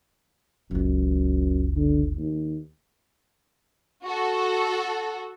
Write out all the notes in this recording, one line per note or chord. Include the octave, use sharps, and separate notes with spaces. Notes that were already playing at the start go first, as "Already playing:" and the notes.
F#1 C#2 F#2
D3
D#2
F#4 A4